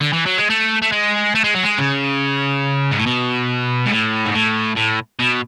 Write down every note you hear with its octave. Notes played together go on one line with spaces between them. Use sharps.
D3
E3
F#3
G#3
A3
A3
G#3
A3
G#3
F#3
G#3
C#3
G#2
A2
B2
G#2
A2
G#2
A2
A2
B2